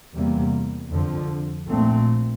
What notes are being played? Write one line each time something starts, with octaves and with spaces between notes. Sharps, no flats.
E2 C3 G3 A#3
F2 D3 F3
A#1 A#2 A3 C4